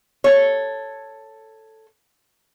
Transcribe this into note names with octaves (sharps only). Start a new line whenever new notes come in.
A4 C#5